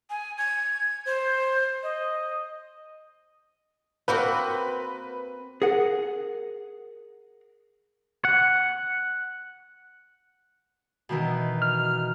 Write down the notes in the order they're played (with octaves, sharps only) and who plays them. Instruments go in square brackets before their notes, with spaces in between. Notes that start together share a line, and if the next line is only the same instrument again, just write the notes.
[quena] G#5
G#6
C5
D#5
[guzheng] A#3 C4 F#4 [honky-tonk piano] B4
[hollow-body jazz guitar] G#4 A#4 F#5
[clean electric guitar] F#5
[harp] B2 D#3 E3
[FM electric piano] F6